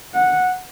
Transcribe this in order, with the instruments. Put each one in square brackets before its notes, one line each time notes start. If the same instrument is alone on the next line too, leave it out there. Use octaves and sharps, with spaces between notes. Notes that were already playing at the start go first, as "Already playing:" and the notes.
[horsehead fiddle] F#5